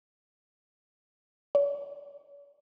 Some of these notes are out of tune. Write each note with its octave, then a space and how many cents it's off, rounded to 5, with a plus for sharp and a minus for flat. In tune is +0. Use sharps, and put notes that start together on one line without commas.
C#5 +45